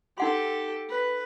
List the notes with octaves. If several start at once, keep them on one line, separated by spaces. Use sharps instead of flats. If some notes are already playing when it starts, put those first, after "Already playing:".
D#4 G4 A4 F#5 C6
B4